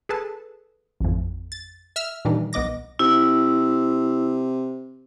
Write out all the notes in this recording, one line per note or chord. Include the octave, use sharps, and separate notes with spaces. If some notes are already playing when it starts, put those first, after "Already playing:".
G#4 A4 B4 A5
A1 F2
A6
E5 E6 F6
A#2 D#3 E3 G3 D4 D#4
B1 B3 D#5 D6 A#6
C3 E4